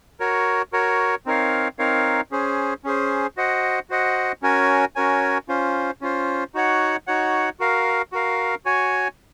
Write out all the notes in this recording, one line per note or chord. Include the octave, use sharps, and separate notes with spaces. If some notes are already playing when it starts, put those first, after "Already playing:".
F#4 A#4 C#5
F#4 A#4 C#5
C4 D#4 A#4 C#5 F5
C4 D#4 A#4 C#5 F5
C#4 G#4 C5
C#4 G#4 C5
F#4 C5 D#5 F#5
F#4 C5 D#5 F#5
C#4 F#4 A#4 C#5 G#5
C#4 F#4 A#4 C#5 G#5
C#4 F4 C5
C#4 F4 C5
D#4 F#4 C#5 F#5
D#4 F#4 C#5 F#5
F#4 A#4 F5
F#4 A#4 F5
F#4 C#5 G#5